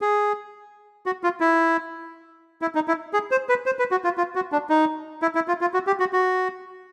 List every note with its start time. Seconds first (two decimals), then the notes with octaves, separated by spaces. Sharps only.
0.01 G#4
1.06 F#4
1.24 F4
1.40 E4
2.62 E4
2.75 D#4
2.88 E4
3.13 G#4
3.31 C5
3.49 B4
3.66 C5
3.79 B4
3.91 F#4
4.04 F4
4.18 F4
4.35 F#4
4.52 D4
4.69 D#4
5.22 E4
5.35 E4
5.48 F4
5.61 F4
5.74 F#4
5.87 G4
6.00 F#4
6.13 F#4